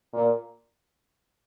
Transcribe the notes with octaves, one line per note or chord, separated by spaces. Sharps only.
A#2